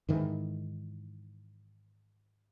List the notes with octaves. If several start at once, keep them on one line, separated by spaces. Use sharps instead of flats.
G#2 D#3 E3